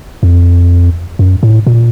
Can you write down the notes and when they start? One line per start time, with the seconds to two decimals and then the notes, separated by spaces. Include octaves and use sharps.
0.23 F2
1.19 F#2
1.43 A2
1.67 A#2